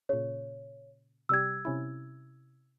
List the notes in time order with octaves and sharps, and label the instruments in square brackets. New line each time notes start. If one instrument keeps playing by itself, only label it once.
[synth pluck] A#2 C#3 [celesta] C#5
[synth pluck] C3 G3 G4 [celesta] E6 G#6
[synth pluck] C3 C#4 E4